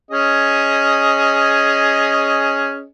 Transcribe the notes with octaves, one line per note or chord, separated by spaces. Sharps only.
C#4 G#4 D#5